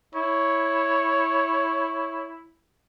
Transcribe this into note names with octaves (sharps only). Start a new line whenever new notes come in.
E4 C#5